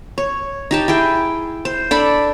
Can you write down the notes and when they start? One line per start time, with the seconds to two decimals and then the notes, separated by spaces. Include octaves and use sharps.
0.18 C#5
0.71 D#4 G4 A5
0.88 E4 G#4 G5
1.65 C5
1.91 D4 A4 D5 B5